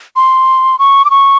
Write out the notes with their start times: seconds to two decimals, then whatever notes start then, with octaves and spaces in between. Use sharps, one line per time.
0.16 C6
0.79 C#6
1.05 D6
1.10 C#6